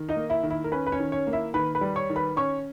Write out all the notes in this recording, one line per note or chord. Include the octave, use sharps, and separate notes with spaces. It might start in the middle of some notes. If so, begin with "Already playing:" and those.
Already playing: D#3
D#4 D#5
A#3
E4 E5
D#3
E4 E5
A#4
C#4 B4
B4
C#4 C#5
D#3
C#4 C#5
A#3
E4 E5
D#3 B4 B5
B4 B5
G3
C#5 C#6
D#3
B4 B5
C#4 C#5 C#6